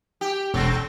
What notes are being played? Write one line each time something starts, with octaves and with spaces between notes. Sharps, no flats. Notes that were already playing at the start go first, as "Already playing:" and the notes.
G4
E1 C#3 C4